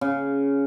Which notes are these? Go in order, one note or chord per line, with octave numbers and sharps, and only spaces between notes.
C#3